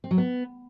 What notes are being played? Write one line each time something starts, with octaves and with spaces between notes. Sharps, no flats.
C4
F#3
B3